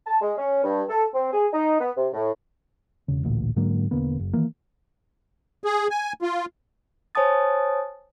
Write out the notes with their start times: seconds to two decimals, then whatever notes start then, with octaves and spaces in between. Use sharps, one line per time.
0.07 A5
0.22 G#3
0.37 C#4
0.64 G2
0.89 A4
1.13 C4
1.33 G#4
1.53 D#4
1.81 B3
1.97 C3
2.13 A2
3.08 E1 C#3
3.25 A1 D2 A#2
3.56 G#2 D3 F#3 A#3
3.91 E1 D3 A#3 B3
4.19 F#1
4.33 D#3 E3 A#3
5.63 G#4
5.90 G#5
6.22 F4
7.15 C5 C#5 G#5 A5 D#6 A6